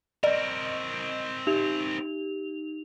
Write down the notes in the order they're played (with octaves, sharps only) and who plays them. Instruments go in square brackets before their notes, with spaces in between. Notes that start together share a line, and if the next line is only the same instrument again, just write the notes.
[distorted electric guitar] C4 A#4 [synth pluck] D5 [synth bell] D#5
[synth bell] D#4 G4 F7